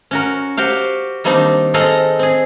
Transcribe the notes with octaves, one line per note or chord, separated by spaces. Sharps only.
C#4 F#4 A#4
F#4 G4 C5 F5
D#3 G3 A#3 C4 D4 D#4
G#3 C4 A4 D#5 F5 A#5
C4 G#4